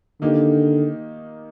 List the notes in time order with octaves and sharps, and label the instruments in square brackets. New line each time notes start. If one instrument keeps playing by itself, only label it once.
[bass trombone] D3 [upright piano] D#3 A#3 D#4 G4